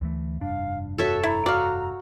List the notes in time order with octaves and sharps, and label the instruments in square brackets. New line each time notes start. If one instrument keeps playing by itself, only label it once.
[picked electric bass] D2 E3 A3
[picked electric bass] F1 G2 D4 [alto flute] F5
[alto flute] F#4 [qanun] A4 C#5 E5
[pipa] E4 [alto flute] A#5
[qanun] F#4 [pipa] D5 F5